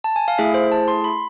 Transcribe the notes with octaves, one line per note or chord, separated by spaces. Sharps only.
A5
G#5
F5
A3 E4 G#4 E5
C5
A5
C6
B5